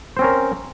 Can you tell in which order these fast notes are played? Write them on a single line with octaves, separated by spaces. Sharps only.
C5 C4 C#4 A#4